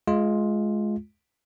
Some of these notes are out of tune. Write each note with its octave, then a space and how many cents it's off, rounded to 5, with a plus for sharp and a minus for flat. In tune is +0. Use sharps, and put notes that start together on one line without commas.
G#3 +20 F4 +0